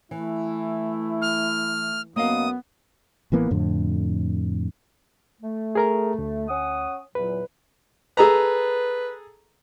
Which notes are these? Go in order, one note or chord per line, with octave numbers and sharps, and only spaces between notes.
E3 A3 E4
F6
F#2 A#3 B3 D#5 F5 D#6
A1 E3 A#3 B3
F2 A2 D3
A3
G#4 A#4 A#5
D2
C#4 F#5 D#6
E2 A#2 F#3 B4
G#4 A4 B4 A#5